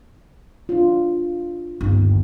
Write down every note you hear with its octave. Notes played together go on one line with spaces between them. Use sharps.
D4 F4
G1 D#2 D#4